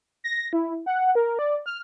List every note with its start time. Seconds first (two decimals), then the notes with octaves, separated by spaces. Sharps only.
0.24 A#6
0.53 E4
0.86 F#5
1.15 A#4
1.39 D5
1.66 F6